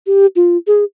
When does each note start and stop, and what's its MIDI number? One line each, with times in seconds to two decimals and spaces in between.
0.07 0.26 67
0.36 0.57 65
0.67 0.84 68